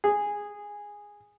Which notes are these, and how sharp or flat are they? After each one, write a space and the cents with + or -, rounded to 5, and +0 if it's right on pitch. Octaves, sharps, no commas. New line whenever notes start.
G#4 -10